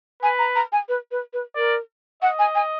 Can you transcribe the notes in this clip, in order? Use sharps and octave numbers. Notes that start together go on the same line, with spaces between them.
B4 G#5
A#5
A#5
G#5
B4
B4
B4
A#4 D5
D#5 F#5
G#5
G#5